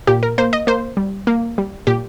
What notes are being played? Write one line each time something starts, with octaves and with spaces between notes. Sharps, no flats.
A#2 G4
A#4
A#3 C5
D#5
A#3 C5
G3
A#3
G3
A#2 G4